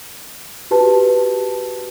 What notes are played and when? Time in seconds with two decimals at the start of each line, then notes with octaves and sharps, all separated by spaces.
0.71 F#4 G4 B4 A5